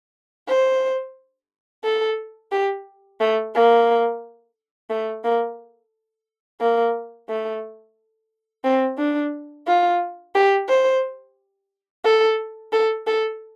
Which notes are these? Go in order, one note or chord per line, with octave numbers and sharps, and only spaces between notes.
C5
A4
G4
A3
A#3
A3
A#3
A#3
A3
C4
D4
F4
G4
C5
A4
A4
A4